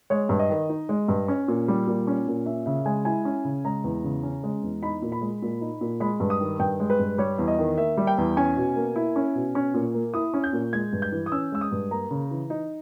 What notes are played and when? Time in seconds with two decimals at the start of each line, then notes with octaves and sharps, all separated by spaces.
0.10 G#3 C#5
0.29 G2
0.39 D#5
0.50 D#3
0.69 D#4
0.89 G#3
1.08 G2
1.28 C#4
1.48 A#2
1.68 G3
1.87 A#2
2.07 C#4
2.27 A#2
2.46 C#4 E5
2.66 C#3 E5
2.86 G#3 G#5
3.05 E4 G#5
3.25 C#4
3.45 C#3
3.65 G#3 A#5
3.84 E2
4.04 C#3
4.23 C#4
4.44 G#3
4.63 E2
4.83 D#4 B5
5.02 A#2
5.12 B5
5.21 G#3
5.42 A#2
5.61 D#4
5.81 A#2
6.00 G#3 B5
6.20 G2
6.30 D#6
6.40 D#3
6.59 G2 G5
6.80 G#3
6.90 B4
6.99 G2
7.18 G3 C#5
7.38 E2
7.48 D#5
7.59 D#3
7.78 A#3 E5
7.97 G3
8.07 G5
8.18 E2
8.37 C#4 G#5
8.57 B2
8.76 A#3
8.96 E4
9.16 C#4
9.35 B2
9.55 C#4
9.74 A#2
9.94 A#3
10.14 E4 D#6
10.34 C#4
10.44 G6
10.53 A#2
10.73 G#3 G#6
10.93 G2
11.02 G6
11.12 E3
11.26 D#6
11.32 C#4 E6
11.52 G#3 E6
11.61 D#6
11.72 G2
11.91 A#3 A#5
12.11 C#3
12.31 E3
12.50 D#4